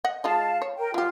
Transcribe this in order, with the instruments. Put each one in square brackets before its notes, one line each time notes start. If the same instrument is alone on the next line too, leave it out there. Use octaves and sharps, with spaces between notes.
[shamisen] D#5 F#5
[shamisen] G#3 F4 D#5 [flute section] F5 A5
[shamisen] C#5
[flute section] A#4 G5
[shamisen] F#3 G4 [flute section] F4